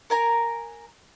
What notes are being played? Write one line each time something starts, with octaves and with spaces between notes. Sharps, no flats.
A#4 G#5 A#5